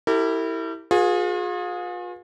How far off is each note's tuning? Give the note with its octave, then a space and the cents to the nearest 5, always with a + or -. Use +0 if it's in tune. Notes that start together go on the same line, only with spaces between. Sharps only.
E4 -10 G4 -15 A#4 -45
F4 +40 G#4 +0 B4 -30